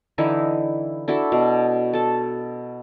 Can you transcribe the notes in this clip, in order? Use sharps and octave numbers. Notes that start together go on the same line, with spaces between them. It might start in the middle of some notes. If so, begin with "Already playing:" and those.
D3 E3 D#4 E4
D4 E4 F#4 A4
B2
A4 A5